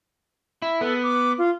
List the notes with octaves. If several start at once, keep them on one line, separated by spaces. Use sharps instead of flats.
E4
B3 A4
D6
F4